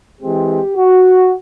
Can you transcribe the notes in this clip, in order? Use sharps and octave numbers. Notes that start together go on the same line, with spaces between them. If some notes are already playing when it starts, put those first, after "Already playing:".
E3 G#3 C4 G4
F#4